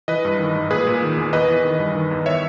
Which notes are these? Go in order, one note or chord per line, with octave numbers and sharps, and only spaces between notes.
E3 B4 D#5
G2
D#3
G#2
A#2 G#4 B4
A#2
D#3
E2
E2 B4 D#5
E3
D#3
G2
D#3
E2
D#3 C#5 E5